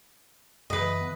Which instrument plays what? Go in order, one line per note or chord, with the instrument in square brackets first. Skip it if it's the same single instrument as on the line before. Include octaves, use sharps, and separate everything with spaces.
[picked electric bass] F#2 C#3 E3 [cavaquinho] B4 D#5
[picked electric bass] E3 B3